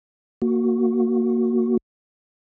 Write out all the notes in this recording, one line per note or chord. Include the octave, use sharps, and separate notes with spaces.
A#3 F#4